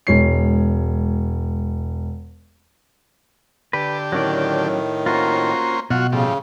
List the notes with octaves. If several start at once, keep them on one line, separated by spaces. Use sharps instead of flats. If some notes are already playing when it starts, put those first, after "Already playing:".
E1 G#3 C#5 C7
D3 G4 B4
A2 D#3 F#3 C#4 D5
A#3 C#4 F4 F#4 C5
B2 F#3 F4 F#4
A2 C#3 F3 G3